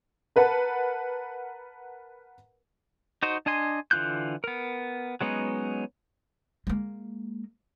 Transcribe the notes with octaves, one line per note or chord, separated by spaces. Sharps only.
A#4 B4 F#5 A5
D#4 F#4 C5 D#5
D4 D#5 G#5 C6
D3 E3 F4 F#6 G6
B3 A#4
F#3 G#3 B3 C#4 D#4
G#3 A#3